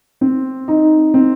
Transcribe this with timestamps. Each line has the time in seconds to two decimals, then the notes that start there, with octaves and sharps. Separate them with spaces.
0.21 C4
0.68 D#4
1.14 C4